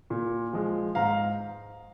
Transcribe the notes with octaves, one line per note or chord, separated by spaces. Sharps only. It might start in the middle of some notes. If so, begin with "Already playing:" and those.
A#2
F3 G#3
G#2 F5 A#5